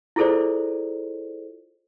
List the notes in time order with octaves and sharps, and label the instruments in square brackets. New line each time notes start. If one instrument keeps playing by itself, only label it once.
[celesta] E4 F4 G#4 A4 C5 D5